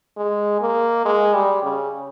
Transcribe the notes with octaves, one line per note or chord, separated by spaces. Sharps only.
G#3
A#3
G#3
G3
C#3